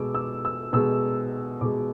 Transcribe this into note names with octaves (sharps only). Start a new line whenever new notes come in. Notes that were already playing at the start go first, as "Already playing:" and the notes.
Already playing: B2 G#3 D6 E6
E6
E6
B2 G#3 E6
B2 G#3 D6